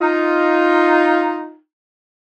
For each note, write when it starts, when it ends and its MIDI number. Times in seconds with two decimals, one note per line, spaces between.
0.01 1.55 63
0.01 1.55 65